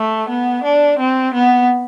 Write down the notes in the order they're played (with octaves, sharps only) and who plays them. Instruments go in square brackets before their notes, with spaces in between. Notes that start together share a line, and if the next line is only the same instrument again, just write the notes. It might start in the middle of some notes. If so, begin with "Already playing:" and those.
Already playing: [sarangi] A3
B3
D4
C4
B3